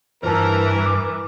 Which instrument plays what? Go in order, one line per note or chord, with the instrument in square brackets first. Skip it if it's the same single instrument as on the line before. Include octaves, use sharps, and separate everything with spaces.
[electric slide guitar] E2 G2 [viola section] E3 [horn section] A#4 [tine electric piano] C5 A5
[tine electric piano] D6